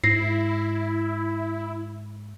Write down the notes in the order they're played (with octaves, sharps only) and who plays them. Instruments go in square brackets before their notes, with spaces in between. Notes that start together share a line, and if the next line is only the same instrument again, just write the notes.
[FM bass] G#2 [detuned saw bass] E4 [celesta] A#6 C7